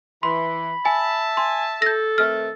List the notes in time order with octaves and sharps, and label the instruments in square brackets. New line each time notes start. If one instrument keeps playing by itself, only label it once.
[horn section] E3 [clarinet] B5 [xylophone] C6
[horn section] E5 A5 [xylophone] G#5
[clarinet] G#5 [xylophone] C6
[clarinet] A4 [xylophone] G6 A#6
[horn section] D#3 A3 C4 [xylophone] F6